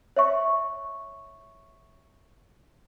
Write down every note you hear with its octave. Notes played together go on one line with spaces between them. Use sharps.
C#5 E5 C#6